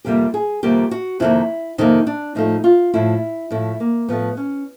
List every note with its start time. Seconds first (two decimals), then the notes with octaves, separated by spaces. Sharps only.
0.05 F2 C3 D#3 G3 A#3 G4
0.34 G#4
0.63 F2 C3 D#3 G3 A#3 G4
0.91 F#4
1.20 F2 C3 D#3 G3 A#3 E4
1.78 F2 C3 D#3 G3 A#3 D#4
2.07 D4
2.35 A2 F3 A3 D#4
2.64 F4
2.93 A2 F3 A3 E4
3.51 A2 F3 A3 E4
3.80 A#3
4.09 A2 F3 A3 B3
4.37 C#4